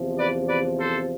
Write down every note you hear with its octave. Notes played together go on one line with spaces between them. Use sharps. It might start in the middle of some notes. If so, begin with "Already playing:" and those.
Already playing: E2 C3 F3
B4 D5
B4 D5
A4 C5